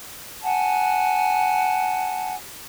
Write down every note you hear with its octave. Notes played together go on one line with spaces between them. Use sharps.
F#5 G#5 A5